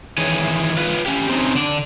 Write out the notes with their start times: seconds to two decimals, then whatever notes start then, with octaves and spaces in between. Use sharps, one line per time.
0.18 D#3 E3 G#4 C#5 G#5
0.77 F4 B4
1.06 C#4 G4
1.29 C4 C#4 D#4
1.55 D3 D4 D5